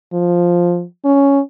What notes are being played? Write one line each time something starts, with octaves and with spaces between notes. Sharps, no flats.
F3
C#4